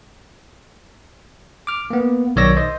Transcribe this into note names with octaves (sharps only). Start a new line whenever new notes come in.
D6 F6
A#3 B3
B1 D#3 C#5 D5 E6 A#6
C5 D#5